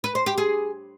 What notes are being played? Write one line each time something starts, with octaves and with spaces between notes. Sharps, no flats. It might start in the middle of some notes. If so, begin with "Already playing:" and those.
B4
C5
G4
G#4